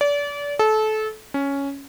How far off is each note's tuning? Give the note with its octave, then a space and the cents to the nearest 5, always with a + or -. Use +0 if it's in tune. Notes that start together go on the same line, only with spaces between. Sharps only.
D5 -30
A4 -25
C#4 +5